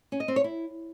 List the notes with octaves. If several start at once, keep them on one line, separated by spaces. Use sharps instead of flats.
C#4
D#5
C4
C#5
E4